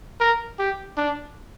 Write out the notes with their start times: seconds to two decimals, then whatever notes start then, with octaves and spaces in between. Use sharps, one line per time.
0.20 A#4
0.59 G4
0.97 D4